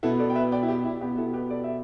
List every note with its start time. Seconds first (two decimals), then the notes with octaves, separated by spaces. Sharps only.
0.03 B2 B3 E4 A4
0.19 A4 D5
0.30 G5
0.35 B4 E5
0.52 D5 G5
0.63 E4
0.68 G4
0.85 E4
1.01 B2 B3 G4
1.17 E4 A4
1.33 G4 B4
1.50 A4 D5
1.64 E5